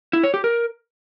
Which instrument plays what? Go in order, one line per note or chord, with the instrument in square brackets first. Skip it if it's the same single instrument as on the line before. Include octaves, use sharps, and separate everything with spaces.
[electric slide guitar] E4
C#5
G4
A#4